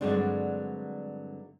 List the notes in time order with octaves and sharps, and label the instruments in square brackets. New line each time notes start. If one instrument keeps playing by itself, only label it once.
[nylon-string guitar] G2 D3 F#3 G#3 C4 D4